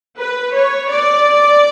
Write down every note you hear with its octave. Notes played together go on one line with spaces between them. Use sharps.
B4
C#5
D5